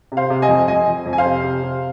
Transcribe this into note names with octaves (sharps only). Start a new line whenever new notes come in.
C3
C5 F5
C3
D#5 G#5
F2
F2 D#5 G#5
F2
F2
G#5
C5 F5
C3
C3
C3